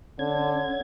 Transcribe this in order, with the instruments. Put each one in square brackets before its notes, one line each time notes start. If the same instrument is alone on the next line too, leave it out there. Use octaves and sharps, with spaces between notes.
[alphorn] D3 [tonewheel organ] C#4 G#6